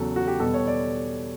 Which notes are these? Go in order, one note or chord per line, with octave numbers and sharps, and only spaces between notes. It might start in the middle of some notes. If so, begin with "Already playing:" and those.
Already playing: E2 C#3 F#3 A4
F#4
G4
E2 B2 G3 B3 A4
C#5
D5